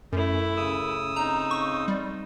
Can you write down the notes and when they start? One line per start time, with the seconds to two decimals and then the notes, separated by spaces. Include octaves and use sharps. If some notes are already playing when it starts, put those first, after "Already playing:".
0.12 F#2 A3 E4
0.57 C#3 D#6 E6
1.16 C4 D#4 A#5
1.51 C#6
1.88 G3